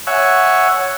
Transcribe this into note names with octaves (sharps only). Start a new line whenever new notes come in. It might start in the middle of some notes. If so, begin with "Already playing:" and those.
C#5 E5 F#5 G#5